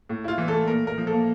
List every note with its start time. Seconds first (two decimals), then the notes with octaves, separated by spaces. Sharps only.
0.09 A2
0.24 E4 F4
0.38 E3
0.48 A4
0.54 A3
0.67 A#2 A#4
0.83 A#2 A#4
0.98 F3
1.07 A4
1.12 A#3